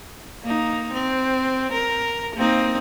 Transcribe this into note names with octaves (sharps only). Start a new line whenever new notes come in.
A#3 D#4
C4
A#4
A#3 C4 D#4